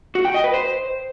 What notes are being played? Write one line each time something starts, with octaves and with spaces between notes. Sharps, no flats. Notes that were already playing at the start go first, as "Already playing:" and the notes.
F#4
G5
D#5
B4
C5